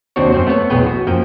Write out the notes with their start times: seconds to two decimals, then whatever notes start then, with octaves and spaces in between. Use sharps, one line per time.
0.16 D#2 C3 C4 D4 F#4 C#5
0.32 F#2 C4 C5
0.47 A3 B3 A4 C#5
0.70 B1 E2 B3 G#4 B4 G5
0.87 F#4
1.07 F#2 F3 A#3 G5